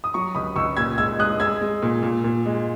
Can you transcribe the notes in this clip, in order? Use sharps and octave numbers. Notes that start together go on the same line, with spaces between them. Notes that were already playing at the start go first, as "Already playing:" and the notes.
D#6
F#3 A#5 C#6
C#2 B5 D#6
C#2 C#6 E6
A#2 E6 G#6
G#3 E6 G#6
G#3 D#6 F#6
G#3 E6 G#6
G#3
A#2
A#2
A#2
G#3